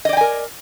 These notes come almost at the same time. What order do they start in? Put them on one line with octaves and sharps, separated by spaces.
D#5 D5 G5 G#5 A#4